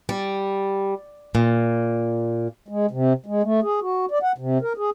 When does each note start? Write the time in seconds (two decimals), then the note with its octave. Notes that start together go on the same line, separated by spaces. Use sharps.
0.09 G3
1.35 A#2
2.68 G#3
2.91 C3
3.26 G#3
3.43 A3
3.63 G#4
3.81 F#4
4.11 D5
4.23 F#5
4.38 C3
4.62 A#4
4.77 G#4